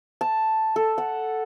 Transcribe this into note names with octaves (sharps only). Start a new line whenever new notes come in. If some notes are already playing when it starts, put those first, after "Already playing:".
A5
A4
F#5